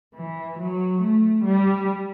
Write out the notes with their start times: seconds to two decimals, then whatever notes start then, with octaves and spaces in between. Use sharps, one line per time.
0.15 E3
0.58 F#3
1.01 A3
1.43 G3